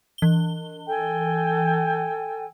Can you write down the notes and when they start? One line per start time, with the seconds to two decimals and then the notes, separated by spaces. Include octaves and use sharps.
0.18 E3 G7
0.87 A4 G5 G#5